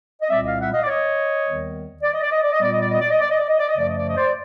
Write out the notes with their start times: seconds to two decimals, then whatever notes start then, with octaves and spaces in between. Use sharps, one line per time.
0.22 D#5
0.29 C2 A#2 G3 C4 D5 E5
0.44 D#5 F5
0.59 E5 F#5
0.73 D#5 F5
0.82 D5
0.87 C#5 D#5
1.45 D#2 D#3 G3 B3
2.03 D5
2.13 D#5
2.22 D5
2.32 D#5
2.43 D5
2.52 D#5
2.61 A#2 G3 B3 D5
2.71 D#5
2.81 D5
2.91 D#5
3.00 D5
3.10 D#5
3.20 D5
3.30 D#5
3.39 D5
3.48 D#5
3.59 D5
3.67 D#5
3.77 F#2 C#3 F3 A3 D5
3.87 D#5
3.96 D5
4.06 D#5
4.16 C5 D5